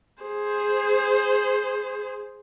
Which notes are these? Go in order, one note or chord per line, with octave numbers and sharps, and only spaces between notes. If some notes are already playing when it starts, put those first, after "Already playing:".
G#4 C5